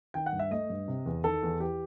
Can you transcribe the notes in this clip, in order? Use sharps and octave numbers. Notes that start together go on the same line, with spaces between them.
D#3 G5
F#5
G2
E5
A3 D#5
G2
C3
E2
D#3 A4
E2
E3 G4